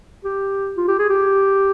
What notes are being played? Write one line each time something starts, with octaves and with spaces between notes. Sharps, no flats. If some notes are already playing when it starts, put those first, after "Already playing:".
G4
F4
G4
G#4
G4